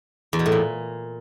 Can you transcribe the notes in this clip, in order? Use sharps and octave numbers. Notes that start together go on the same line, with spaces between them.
E2
B2
A2
A#2